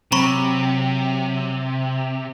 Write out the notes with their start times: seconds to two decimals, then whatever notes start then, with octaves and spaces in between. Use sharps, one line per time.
0.12 C3 F#3 C4 A#5 B5 C#6